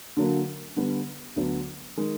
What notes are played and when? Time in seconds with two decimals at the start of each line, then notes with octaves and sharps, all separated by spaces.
0.17 D3 F#3 A#3
0.76 D3 G3 B3
1.36 D2 D3 F#3 B3
1.97 D#3 G#3